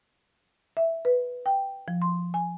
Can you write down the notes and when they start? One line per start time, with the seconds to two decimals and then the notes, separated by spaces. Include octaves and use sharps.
0.77 E5
1.05 B4
1.46 G5
1.88 F3
2.02 C6
2.34 G#5